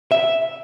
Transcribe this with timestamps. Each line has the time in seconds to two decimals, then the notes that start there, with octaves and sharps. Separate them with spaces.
0.12 E5